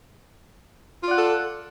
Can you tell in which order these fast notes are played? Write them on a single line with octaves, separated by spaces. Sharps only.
F4 D5 F#5 A4